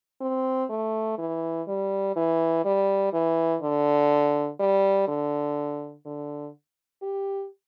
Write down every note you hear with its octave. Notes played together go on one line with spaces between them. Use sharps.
C4
A3
E3
G3
E3
G3
E3
D3
G3
D3
D3
G4